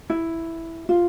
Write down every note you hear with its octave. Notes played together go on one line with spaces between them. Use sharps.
E4
F4